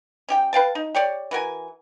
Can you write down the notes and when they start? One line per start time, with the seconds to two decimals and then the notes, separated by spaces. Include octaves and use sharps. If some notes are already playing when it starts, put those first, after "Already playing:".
0.29 C#4 G4 G5
0.53 B4 F5 G5 A5
0.75 D#4
0.95 G4 C#5 D5
1.31 E3 F#4 A#4 G#5